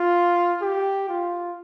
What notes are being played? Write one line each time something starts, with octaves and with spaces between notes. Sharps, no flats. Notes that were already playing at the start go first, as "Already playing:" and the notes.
Already playing: F4
G4
F4